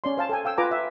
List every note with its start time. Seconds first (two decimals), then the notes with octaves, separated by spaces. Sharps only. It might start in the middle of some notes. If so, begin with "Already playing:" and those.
0.04 C#4 D5 C6
0.17 C5 F5 A5
0.29 A4 G5 G#5
0.45 F5 G5 E6
0.58 F4 B4 G#5 A#5 D6
0.71 E5